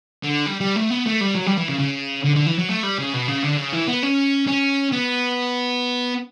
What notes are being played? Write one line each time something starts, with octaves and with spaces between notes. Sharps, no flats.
D3
G3
G3
A3
B3
A3
G3
F#3
G3
E3
C#3
C#3
D3
D3
E3
F#3
A3
G3
C#3
B2
C#3
D3
C#3
E3
B3
C#4
C#4
B3